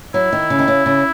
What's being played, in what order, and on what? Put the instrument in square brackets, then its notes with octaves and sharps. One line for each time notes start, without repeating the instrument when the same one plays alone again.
[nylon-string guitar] F#3 [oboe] E4
[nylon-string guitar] D#3
C#3
D#3
C#3
C#3